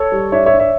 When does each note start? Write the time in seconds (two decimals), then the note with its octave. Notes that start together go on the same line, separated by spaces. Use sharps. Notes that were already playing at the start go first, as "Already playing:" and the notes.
Already playing: A4 C#5
0.12 G3
0.32 D4 C#5 E5
0.46 C#5 E5
0.53 D4
0.59 C#5 E5